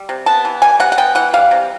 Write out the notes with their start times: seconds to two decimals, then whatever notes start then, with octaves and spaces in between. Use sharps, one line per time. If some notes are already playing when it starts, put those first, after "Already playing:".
Already playing: G3
0.09 C3
0.26 B3 A5
0.45 E3
0.62 G3 G#5
0.80 C3 F#5
0.92 F#5
0.98 B3 G5
1.15 E3 F#5
1.33 G3 F5
1.51 C3